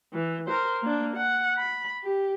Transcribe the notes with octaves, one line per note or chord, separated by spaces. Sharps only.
E3
A#4 C5
A#3 D4
F#5
B5
G4